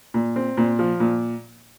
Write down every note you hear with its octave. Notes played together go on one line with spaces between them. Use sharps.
A#2
C4
A#2
F3
A#2